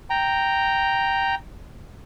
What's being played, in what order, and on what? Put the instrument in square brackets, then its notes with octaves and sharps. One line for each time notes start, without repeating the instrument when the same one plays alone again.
[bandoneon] G5 A#5